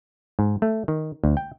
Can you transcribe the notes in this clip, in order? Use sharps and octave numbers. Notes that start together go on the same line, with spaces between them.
G#2
A3
D#3
D2
G5